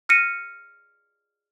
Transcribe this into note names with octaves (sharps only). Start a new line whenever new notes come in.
F6 A#6 C#7 D#7